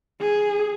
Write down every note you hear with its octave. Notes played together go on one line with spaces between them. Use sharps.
G#4